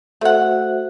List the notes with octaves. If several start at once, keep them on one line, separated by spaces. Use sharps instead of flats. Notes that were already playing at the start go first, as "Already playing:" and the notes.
A3 F#4 C5 E5 F#5